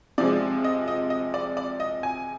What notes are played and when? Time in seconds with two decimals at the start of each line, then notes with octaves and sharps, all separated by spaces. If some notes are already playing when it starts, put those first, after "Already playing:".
0.18 C3 F3 G#3 D5
0.64 D#5
0.88 D#5
1.10 D#5
1.34 D5
1.57 D5
1.80 D#5
2.03 G#5